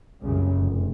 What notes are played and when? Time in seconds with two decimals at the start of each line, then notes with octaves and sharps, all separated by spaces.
0.22 C2 F#2 A#2 C#3
0.56 F1